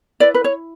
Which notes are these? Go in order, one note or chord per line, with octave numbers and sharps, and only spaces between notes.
E4 B4 D5
B4
C#5